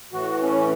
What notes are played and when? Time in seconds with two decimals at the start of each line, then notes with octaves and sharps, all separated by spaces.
0.12 A2 E3 F#4
0.43 C#4